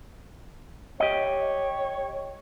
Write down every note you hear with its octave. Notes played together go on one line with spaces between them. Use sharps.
G4 C#5 D#5